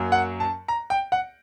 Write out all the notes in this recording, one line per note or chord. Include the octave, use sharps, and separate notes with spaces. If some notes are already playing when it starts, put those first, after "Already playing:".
Already playing: F#2 F#3 A#3
F#5
A5
A#5
G5
F#5